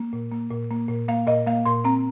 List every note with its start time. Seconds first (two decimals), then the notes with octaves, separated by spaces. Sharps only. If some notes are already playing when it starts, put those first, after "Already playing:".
Already playing: A#3
0.13 A#2
0.32 A#3
0.51 A#2
0.71 A#3
0.89 A#2
1.08 A#3 F5
1.27 A#2 D#5
1.46 A#3 F5
1.65 A#2 C6
1.85 C4 A#5